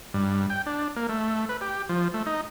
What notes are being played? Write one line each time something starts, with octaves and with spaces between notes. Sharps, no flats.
G2
G5
D4
A#3
A3
B4
G4
F3
A3
D#4